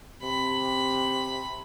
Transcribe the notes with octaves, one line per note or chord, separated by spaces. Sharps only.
C3 B5